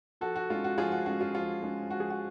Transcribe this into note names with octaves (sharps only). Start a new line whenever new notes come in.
F3 F#4 A4
F#4
G#3 C#4 F4
F#4
F3 F4 G#4
F#4
G#3 C#4 F#4
F4
F3 F4
G#3 C#4
F3 F#4
G#4
F#4